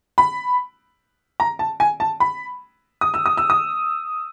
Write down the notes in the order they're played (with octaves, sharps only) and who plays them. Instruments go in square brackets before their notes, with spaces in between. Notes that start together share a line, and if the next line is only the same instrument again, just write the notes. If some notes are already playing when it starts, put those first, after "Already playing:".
[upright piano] B5
A#5
A5
G#5
A5
B5
D#6
E6
D#6
E6
D#6